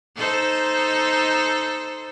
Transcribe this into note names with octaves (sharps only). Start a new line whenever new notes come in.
D#4 A4 C5